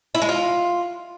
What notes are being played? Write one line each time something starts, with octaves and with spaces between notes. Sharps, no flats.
E4
G#3
F4